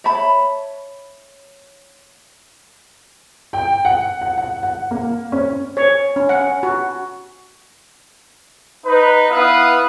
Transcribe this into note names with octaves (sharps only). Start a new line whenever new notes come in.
C#5 E5 A5 B5
G5
F#5
F#5
F#5
F#5
A#3
C#4
C#5
C#4
F#5
F#4
D#4 B4
B3 E4 B4 F5 D#6